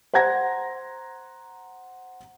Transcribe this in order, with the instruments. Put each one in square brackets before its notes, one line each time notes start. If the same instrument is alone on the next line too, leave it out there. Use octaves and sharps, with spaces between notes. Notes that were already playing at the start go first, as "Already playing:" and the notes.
[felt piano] C5 F#5 A#5 G#6 A#6